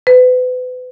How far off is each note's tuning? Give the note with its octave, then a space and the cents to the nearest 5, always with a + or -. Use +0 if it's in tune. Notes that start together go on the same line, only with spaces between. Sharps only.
B4 +35